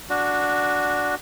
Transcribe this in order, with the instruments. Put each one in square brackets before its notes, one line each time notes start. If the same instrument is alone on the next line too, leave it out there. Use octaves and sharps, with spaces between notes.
[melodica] D4 F#4